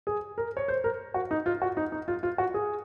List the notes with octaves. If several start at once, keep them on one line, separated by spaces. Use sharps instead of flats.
G#4
A#4
C#5
C5
A#4
F#4
D#4
F4
F#4
D#4
D#4
F4
F4
F#4
G#4